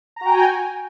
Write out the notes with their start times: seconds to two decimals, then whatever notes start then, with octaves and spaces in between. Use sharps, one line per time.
0.16 A#5
0.21 F#4
0.26 G5
0.30 G#5